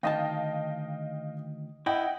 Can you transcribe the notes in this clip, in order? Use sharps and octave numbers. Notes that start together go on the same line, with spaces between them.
D2 D#3 D#5 F5 G5 A5
E4 D#5 F#5 G5